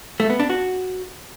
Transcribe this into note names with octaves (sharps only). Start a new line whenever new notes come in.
A3
B3
D4
F#4